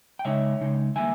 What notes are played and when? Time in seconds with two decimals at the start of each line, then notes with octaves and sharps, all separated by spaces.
0.19 G5
0.25 C#3 G#3 D#4 C#5 E5
0.61 C#3 G#3 D#4
0.96 D#3 G3 A#3 E5 G#5